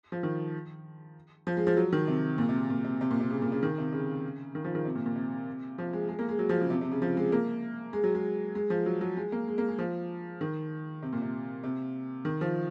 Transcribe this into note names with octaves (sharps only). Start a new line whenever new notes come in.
F3
D#3
F3
G#3
F3
F#3
D#3
C3
A#2
C3
A#2
C3
C3
A#2
C3
C#3
A#2
C#3
D#3
C3
C#3
D#3
F3
D#3
C3
A#2
A#2
C3
F3
G#3
G#3
A#3
G#3
F#3
F3
C#3
C3
C3
C#3
F3
G#3
A#3
G#3
F#3
G#3
G#3
F3
F#3
F#3
G#3
A#3
G#3
A#3
G#3
F3
D#3
C3
A#2
C3
C3
D#3
F3